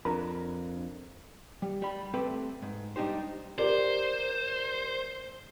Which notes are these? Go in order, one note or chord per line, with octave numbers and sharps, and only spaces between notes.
F2 D4 A#4 B5
G3
G3 B5
A3 C4 G4 A4 B4
G#2
G3 D4 D#4 G4 C5
G4 A#4 C5 D5